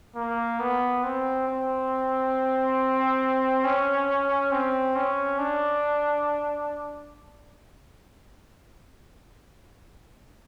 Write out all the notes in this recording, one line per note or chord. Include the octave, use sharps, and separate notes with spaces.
A#3
B3
C4
C4
C#4
C4
C#4
D4